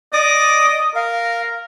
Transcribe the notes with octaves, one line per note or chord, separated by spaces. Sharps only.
D5 D#5 D6 D#6
A#4 F5